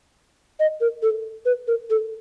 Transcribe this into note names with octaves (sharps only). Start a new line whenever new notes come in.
D#5
A#4
A4
B4
A#4
A4